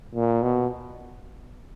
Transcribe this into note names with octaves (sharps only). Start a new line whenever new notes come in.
A#2
B2